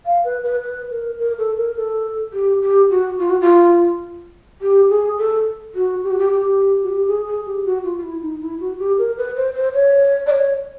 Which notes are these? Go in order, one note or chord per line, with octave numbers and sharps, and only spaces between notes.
F5
B4
B4
B4
A#4
A#4
A4
A#4
A4
G4
G4
F#4
F4
F#4
F4
G4
G#4
A4
F#4
G4
F#4
G4
G4
F#4
G4
G#4
G#4
G4
F#4
F4
F4
E4
D#4
E4
F#4
G4
A#4
B4
C5
C5
C#5
D5
C#5